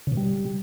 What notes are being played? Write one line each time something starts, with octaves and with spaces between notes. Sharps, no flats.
C#3
B2
G3